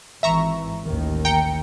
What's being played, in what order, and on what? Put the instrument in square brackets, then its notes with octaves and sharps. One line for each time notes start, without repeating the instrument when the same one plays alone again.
[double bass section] G#1 E3 [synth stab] E5 A#5 C#6
[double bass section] A1 D#2 D#3
[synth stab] G5 A#5 C#7